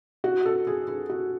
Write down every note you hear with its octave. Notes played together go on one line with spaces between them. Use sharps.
F#4
A4
G#4
G#4
F#4